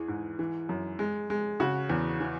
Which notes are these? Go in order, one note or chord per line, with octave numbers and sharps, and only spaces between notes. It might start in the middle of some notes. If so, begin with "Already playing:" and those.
Already playing: E2 E3 G#4
G#2
E3
F#2
G#3
G#3
C#3 F#4
E2
E3